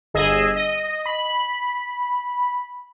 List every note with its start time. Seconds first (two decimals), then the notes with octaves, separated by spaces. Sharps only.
0.14 G1 G#4 D#5 E6
0.56 D#5
1.06 B5